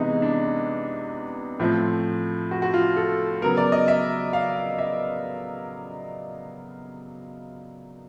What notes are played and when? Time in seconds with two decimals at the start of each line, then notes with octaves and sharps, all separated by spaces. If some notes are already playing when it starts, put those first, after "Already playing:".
Already playing: C3 E3 G#3 B3 D#4
0.22 D4
1.60 A2 F3 A3 C4
2.51 F#4
2.62 F#4
2.74 F4
2.97 A4
3.42 C#3 F#3 B3 A#4
3.57 D5
3.72 D#5
3.88 E5
4.33 F5
4.78 E5